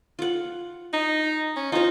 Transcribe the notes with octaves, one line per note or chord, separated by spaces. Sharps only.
F4 F#5
D#4
C#4
D#4 F4 C5